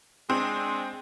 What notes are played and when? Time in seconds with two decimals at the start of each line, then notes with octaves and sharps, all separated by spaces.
0.30 G#3 C4 D4